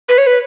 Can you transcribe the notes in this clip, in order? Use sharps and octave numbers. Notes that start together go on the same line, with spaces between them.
B4
C#5
B4